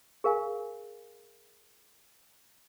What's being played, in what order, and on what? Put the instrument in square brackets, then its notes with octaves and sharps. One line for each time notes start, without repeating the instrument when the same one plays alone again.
[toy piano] G#4 A#4 F5 G#5